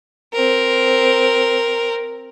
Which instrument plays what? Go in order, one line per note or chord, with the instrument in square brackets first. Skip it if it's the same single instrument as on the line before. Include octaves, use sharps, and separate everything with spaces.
[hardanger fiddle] C4 A#4